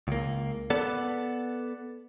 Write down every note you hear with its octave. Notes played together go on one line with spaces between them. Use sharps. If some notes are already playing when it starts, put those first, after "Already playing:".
C#2 A#3
B3 A4 D5